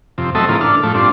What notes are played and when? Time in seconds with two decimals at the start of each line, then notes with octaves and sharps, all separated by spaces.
0.18 F2 C3
0.35 F#3 A3 C4 A4 D#5 E5
0.49 G#2 C#3 E3 A#3 F4
0.61 D4 A4 F6
0.83 A2 F3 A3
0.95 G2 C4 D4 F4